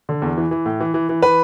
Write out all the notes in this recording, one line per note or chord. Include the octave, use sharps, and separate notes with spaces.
D3
E2
E3
E3
A2
E3
E3
E3
E3 B4